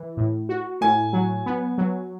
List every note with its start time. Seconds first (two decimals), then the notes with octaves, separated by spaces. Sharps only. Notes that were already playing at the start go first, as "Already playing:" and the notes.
Already playing: E3
0.17 A2
0.49 F#4
0.81 A2 G#5
1.13 F#3
1.46 B3
1.78 F#3